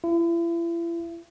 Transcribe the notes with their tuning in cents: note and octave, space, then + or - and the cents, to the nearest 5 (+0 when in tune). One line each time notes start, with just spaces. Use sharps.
E4 +40